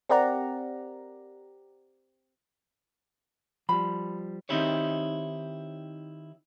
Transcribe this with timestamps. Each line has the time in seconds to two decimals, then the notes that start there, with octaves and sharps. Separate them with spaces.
0.09 C4 G4 A#4 D5 F#5 A#5
3.69 F3 G3 B5
4.49 D#3 C4 D#4 E4 G4 C#5